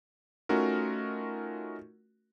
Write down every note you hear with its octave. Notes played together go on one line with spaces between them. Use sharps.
A3 C#4 D#4 F4 F#4 A#4